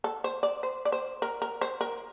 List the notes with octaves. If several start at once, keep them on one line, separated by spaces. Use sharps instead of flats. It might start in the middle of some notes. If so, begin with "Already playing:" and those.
A4
C5
D5
C5
D5
C5
A#4
A#4
C5
A#4